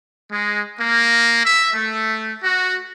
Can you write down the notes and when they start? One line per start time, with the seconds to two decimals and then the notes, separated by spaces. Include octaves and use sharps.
0.31 G#3
0.80 A#3
1.44 E5
1.74 A3
2.44 F#4